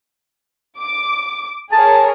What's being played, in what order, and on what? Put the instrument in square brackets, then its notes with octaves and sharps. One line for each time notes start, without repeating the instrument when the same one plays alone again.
[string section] D6
[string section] G#4 A#4 C#5 [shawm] A5